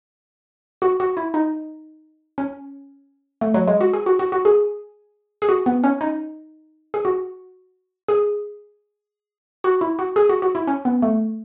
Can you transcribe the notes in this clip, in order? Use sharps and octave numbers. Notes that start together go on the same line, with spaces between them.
F#4
F#4
E4
D#4
C#4
A3
F#3
G#3
F#4
G#4
F#4
F#4
F#4
G#4
G#4
F#4
B3
C#4
D#4
G#4
F#4
G#4
F#4
E4
F#4
G#4
F#4
F#4
E4
C#4
B3
A3